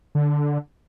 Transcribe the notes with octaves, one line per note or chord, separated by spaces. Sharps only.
D3